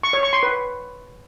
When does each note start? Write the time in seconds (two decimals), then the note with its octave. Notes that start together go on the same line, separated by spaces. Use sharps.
0.03 C#6
0.13 C#5
0.23 C#6
0.33 C6
0.43 B4